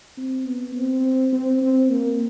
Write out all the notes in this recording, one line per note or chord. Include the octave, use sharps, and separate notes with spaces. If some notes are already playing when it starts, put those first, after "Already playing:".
C4
B3
C4
C4
C4
A#3